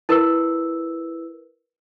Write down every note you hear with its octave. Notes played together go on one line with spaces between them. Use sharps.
E4 A#4 B4 E6